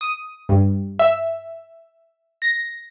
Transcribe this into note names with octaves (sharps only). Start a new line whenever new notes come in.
D#6
G2
E5
A#6